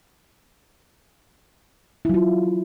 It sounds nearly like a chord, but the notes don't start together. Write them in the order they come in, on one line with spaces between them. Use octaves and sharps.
E4 F#3 F4